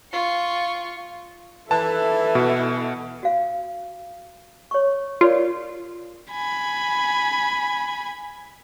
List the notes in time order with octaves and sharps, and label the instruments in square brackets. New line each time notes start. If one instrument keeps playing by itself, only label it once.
[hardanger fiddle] F4 C#6
[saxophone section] E3 [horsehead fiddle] A4 E5 [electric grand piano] A5
[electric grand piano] B2
[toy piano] F#4 F5
C#5 C#6
[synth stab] F4 [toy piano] A#4 C#5 D5
[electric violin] G#5 B5